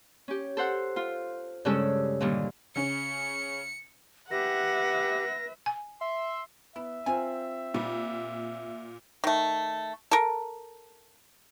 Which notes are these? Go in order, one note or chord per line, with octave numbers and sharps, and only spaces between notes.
C#4 G4
A4 C5 F#5
F4
G2 C#3 G#3 C#4 A4 E6
A#2 D3 D#3 G3 A#3
C#3 C#4 C#7
G4 B4 E5 F#5 A#6
G#5
E5 C6
B3 E4 E5
C4 F4 A#4 C5 G#5
A#2 G3 D#4
D#3 A3
A4 A#4